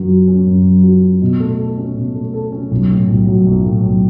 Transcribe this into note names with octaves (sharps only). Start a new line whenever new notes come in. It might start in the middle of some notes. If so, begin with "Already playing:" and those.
Already playing: F#2 F#3
F#4
C#4
F#2
F#3
F#4
C#4
B2
A3
A4
C#4
B2
A3
A4
C#4
B1
A2
B1
F#3
B1
A2
B1